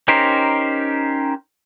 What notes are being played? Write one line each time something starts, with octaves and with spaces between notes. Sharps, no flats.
C#4 D#4 G4 A#4 C5